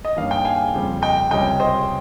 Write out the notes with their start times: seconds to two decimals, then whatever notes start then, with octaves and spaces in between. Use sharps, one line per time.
0.05 D#5
0.16 G2 D#3 G3 A#3 C#4 F5
0.31 G5
0.45 F5 G#5
0.73 F2 C#3 G3 C4
1.02 D#5 G5
1.31 C#2 C3 G3 C#4 D#5 G5
1.60 C5 D#5